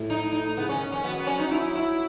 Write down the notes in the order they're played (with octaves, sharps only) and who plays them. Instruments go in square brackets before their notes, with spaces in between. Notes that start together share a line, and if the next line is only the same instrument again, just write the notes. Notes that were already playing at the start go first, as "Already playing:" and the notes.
Already playing: [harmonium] A2
[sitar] D#4
D#4
[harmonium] C#3 [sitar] B3
[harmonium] D#3 [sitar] C#4
[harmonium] D#3 [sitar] C#4
[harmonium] F#3 [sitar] B3
[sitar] B3
C#4
D#4
E4
E4